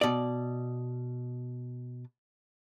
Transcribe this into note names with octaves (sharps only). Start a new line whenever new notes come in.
B2 D5